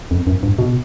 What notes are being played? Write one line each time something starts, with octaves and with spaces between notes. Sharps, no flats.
F2
F#2
G2
B2